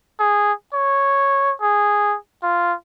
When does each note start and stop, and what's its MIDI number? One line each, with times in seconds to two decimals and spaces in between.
0.20 0.53 68
0.74 1.53 73
1.61 2.16 68
2.43 2.74 65